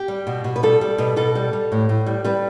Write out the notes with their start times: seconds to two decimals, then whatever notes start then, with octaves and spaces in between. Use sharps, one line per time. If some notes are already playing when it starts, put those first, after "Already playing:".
Already playing: G4
0.08 G3
0.27 B2
0.44 B2
0.56 B4
0.63 G3 A4
0.81 G3
0.98 B2
1.16 B2 A4
1.35 G3
1.53 G3
1.72 A2
1.89 A2
2.07 G3
2.25 G3 B4